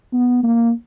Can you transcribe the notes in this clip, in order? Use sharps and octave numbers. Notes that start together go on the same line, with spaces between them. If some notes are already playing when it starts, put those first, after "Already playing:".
B3
A#3